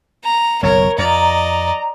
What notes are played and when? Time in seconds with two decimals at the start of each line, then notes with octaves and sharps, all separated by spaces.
0.24 A#5
0.63 F#1 B1 F#2 A#4 C#5
0.98 F2 D5 D#5 A#5